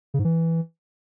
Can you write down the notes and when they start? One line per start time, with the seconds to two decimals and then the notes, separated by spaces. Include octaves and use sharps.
0.14 C#3
0.19 G#2
0.24 E3